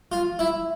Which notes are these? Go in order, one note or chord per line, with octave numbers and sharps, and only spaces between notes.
F4
E4